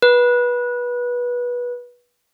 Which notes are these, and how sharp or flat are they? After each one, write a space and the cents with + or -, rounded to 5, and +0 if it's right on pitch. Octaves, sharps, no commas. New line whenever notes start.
B4 -20